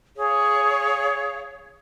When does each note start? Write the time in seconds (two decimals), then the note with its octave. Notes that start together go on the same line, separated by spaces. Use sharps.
0.16 G#4 C#5 F5